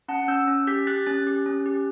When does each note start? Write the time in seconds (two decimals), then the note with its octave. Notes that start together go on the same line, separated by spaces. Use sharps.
0.08 C#4 F#5 A5
0.28 C#4 E6 G6
0.48 C#4
0.67 G4 G6 B6
0.87 G4 F#6 A6
1.06 C#4 F#6 A6
1.27 G4
1.46 C#4
1.66 G4